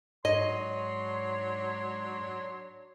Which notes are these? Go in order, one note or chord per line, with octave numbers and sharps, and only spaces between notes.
G#2 F#3 D4 C#5 D#5 C6